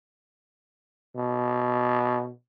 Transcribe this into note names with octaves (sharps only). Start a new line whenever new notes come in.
B2